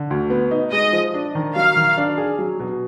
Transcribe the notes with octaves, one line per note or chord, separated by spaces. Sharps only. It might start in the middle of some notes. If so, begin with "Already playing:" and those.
Already playing: D3
D2
B3
D#4
G#3 D#5
F3
D4
D#3
F#3 F5
D#3
D4
G#4
F#3
B2